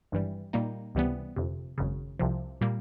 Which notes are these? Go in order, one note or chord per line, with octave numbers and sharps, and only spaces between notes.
G#1 G2 E3 G3
A#2 G3 A#3 D#4
C#2 C3 E3 G3 B3
G1 F2 C3
G#1 F#2 C#3
C2 C3 F3
A#2 G3 A#3